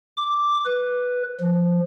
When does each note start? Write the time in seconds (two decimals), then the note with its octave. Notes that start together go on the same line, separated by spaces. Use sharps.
0.17 D6
0.65 B4
1.40 F3